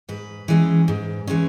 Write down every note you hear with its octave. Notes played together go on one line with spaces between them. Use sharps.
G#2 B4
E3 G#3 C#4
G#2
E3 G#3 C#4